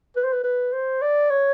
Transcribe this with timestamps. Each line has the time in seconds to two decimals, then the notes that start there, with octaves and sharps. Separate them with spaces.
0.16 B4
0.24 C5
0.33 B4
0.44 B4
0.73 C5
1.02 D5
1.30 C#5